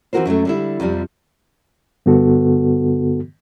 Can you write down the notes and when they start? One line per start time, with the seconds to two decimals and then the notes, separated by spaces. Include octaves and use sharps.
0.13 E3 C4 D#4 F#4 A#4 C5
0.26 F#2 F#3 G#3 A3
0.45 D3 G3 E4
0.80 F2 C3 F3 G3
2.06 G2 D3 B3 F#4 A4